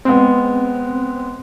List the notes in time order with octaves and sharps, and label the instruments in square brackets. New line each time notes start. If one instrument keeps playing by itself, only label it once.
[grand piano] G#3 B3 [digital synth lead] C4